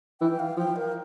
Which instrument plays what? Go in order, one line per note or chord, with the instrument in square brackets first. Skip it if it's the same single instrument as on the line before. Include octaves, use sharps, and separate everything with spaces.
[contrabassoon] E3 [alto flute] G5
[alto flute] F5
[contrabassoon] F3 [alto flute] G5
[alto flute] A#4